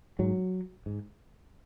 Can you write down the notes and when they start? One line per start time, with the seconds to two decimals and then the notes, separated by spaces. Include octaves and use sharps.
0.19 G#2 F#3
0.86 G#2